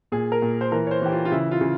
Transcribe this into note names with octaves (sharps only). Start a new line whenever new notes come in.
A#2 G#4
A#4
A#2
C5
E3 A#4
C#5
C5
E3 G4
F4
F4
C#3 E4
F4
C#3